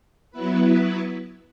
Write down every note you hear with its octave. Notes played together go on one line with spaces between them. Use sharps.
F#3 B3 E4 B4